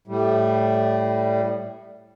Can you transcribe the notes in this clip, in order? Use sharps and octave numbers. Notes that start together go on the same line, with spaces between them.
A2 G3